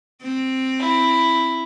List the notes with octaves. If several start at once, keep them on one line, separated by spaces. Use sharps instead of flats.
C4
E4